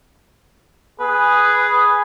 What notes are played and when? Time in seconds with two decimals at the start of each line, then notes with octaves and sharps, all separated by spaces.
1.00 G#4 B4